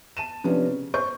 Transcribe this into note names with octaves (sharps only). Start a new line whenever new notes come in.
A5 D#7 E7
C3 F3 B3 C#4 D4
C#3
C5 C#6 G6